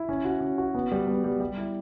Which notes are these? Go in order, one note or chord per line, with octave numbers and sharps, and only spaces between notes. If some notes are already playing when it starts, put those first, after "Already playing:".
Already playing: E4
C#4
F#4
C#4
F#4
B3
G3
B3
G3
G3
E4